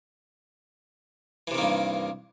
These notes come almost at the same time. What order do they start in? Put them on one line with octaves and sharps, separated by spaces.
E3 C3 D#3 A#3 G2